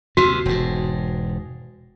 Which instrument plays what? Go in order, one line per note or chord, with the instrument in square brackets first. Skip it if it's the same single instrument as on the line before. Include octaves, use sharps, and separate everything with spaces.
[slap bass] D#2 C3 [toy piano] F#4
[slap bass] E1 G#2